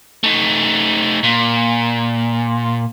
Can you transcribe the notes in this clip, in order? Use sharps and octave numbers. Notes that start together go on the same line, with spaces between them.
A3 D#4
A#2